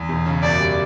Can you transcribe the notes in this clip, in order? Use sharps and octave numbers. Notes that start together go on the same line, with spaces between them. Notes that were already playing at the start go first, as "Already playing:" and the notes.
Already playing: E2
E1
C#3
F#2 D5
G3